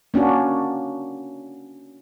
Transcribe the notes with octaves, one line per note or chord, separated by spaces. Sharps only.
A#3 C#4 D4 F#4